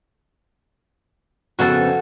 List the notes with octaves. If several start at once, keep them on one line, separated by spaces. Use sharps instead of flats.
F2 C#3 B3 F#4 A4